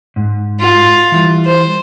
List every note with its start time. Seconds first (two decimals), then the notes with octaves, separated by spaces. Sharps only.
0.16 G#2
0.60 F4
1.12 E3 G3
1.46 C5